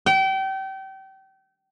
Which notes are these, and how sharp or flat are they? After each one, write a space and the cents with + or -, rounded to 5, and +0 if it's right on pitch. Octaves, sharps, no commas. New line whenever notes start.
G5 -30